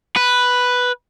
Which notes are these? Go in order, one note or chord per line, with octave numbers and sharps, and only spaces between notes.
B4